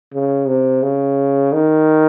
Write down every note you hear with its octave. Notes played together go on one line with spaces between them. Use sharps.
C#3
C3
C#3
D#3